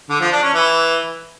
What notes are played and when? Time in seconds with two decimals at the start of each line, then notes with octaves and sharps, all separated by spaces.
0.10 D3
0.21 F3
0.32 D4
0.43 C#4
0.54 E3